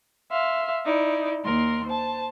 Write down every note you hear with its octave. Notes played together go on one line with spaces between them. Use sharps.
E5 F5 C6
D#4 E4 D5
D#2 A#4 C6
C5 A5